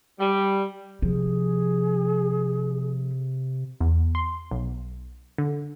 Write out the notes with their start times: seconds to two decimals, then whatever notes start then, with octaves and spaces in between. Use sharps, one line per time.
0.19 G3
1.02 C3 F3 G#4
3.80 E2
4.15 C6
4.51 B1
5.38 D3